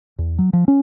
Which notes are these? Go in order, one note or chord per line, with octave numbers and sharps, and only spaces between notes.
E2
F#3
F3
C#4